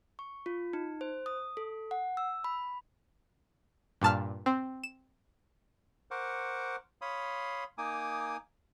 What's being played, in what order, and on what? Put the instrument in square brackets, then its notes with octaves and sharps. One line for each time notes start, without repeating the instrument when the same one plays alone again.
[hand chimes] C#6
F4
D#4
C5
D#6
A4
F#5
E6
B5
[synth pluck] G2 A#2 A5 F6
C4
E7
[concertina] A#4 C5 F#5 C#6 D6
C#5 F5 B5 C6 D#6
A#3 D#4 G#5 D6 D#6